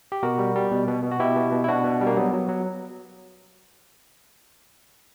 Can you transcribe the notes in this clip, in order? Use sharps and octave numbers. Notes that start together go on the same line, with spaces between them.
G4
B2 F#4 A#4
G3
G3
B2
B2
B2
F#4
B2 E4 G4
B2
B2
E4
B2 D4 F#4
B2
G3
A#3
F#3 B3
F#3
F#3